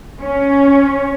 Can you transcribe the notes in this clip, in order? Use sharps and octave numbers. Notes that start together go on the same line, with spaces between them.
C#4